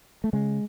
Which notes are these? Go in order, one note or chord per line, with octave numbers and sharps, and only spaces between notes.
A3
C#3 G#3